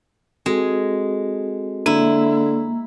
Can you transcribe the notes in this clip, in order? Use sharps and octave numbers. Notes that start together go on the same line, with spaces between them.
G#3 C4 F#4 A4
D3 A#3 E4